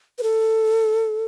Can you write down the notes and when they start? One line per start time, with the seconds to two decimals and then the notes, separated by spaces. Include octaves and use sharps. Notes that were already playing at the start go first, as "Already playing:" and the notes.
0.19 B4
0.23 A4